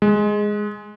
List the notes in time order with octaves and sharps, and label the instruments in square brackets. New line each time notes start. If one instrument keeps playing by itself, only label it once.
[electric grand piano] G#3